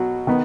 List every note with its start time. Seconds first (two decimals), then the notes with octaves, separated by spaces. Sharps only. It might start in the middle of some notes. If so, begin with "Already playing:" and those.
Already playing: B2 F#3 F#4
0.27 D#3 B3